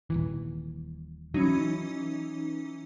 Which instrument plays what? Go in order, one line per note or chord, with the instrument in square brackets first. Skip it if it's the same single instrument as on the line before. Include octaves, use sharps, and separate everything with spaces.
[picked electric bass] D#1 B1 E3
[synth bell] E3 C#4 D#4 [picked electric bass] F#3